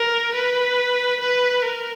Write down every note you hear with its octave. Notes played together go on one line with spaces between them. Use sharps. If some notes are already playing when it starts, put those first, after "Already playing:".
Already playing: A#4
B4
B4
A#4